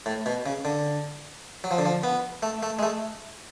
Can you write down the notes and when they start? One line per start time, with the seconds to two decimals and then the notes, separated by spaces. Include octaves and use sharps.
0.06 A2
0.26 B2
0.46 C#3
0.65 D3
1.64 F#3
1.71 F3
1.78 D3
1.85 F3
2.04 B3
2.43 A3
2.63 A3
2.79 G#3
2.83 A3